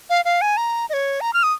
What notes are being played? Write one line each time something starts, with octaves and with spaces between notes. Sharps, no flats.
F5
F5
G#5
A#5
D#5
C#5
A#5
F6
D#6